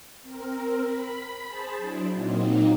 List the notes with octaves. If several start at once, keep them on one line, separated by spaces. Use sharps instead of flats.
C4 A#4
B5
G#4 C5 A5
F#3 D4 E4
A#2 F#3 A#3 C4 D#4